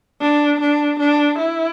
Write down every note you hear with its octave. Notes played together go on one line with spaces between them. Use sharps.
D4
D4
D4
E4